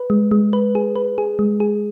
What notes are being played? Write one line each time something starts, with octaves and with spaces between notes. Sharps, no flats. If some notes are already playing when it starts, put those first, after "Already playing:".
Already playing: B4
G#3
G#3
B4
G#4
B4
G#4
G#3
G#4